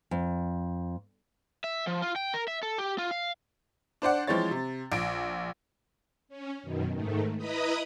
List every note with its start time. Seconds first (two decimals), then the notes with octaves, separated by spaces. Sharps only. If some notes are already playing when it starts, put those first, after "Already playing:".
0.11 F2
1.64 E5
1.87 F3
2.02 F4
2.16 G5
2.34 A#4
2.48 E5
2.63 A4
2.78 G4
2.98 F4
3.11 F5
4.02 D4 C5 D5 F#5
4.27 E3 F3 G#3 C4 C#5 A6
4.51 C3
4.92 A#1 D7
6.29 C#4
6.63 F#2 B2 D#3
6.94 G#2 D#3 A3
7.37 E4 B4 D#5 A#5 B5 D#6